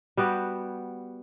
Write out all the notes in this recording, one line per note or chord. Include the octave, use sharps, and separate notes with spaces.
G3 B3 F#4 G4